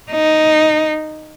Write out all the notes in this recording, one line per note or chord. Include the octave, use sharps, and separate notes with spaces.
D#4